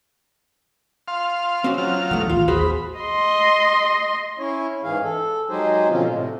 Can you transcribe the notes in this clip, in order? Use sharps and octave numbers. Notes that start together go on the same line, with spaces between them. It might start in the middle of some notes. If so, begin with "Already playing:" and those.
F5 C6
C4 C#4 F#4
F#3 F4 F6
E2 E3 G3 A3
A1 D#2 B3 F4 F5
F#4 G#4 C5 B5
D#5 C6
C#4 E4 C#5
G#2 E3 G#4 F5
A4
F#3 G#3 D#4 G4 G#4 C5
B2 D3 F3 C4 C#4 F4
A2 C3